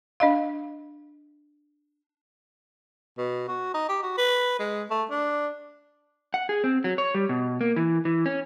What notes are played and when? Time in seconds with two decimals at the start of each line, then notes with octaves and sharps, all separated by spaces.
0.20 D4 D#5 F5
3.18 B2
3.48 F#4
3.74 D#4
3.89 G4
4.03 F#4
4.18 B4
4.59 G#3
4.90 A3
5.10 D4
6.34 F#5
6.49 G#4
6.64 C4
6.84 F#3
6.98 C#5
7.15 G3
7.29 B2
7.61 A#3
7.76 E3
8.05 E3
8.26 C#4